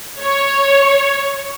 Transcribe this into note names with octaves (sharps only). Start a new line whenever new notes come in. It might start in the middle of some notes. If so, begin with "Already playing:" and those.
C#5